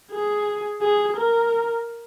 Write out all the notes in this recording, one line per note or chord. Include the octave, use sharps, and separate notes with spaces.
G#4
G#4
A#4